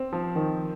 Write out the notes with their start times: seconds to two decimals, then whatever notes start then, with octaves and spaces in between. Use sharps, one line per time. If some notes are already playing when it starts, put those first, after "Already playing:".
Already playing: C4
0.13 F3
0.35 D#3